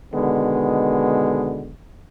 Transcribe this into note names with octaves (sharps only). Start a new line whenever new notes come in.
B2 D3 D#3 G#3 B3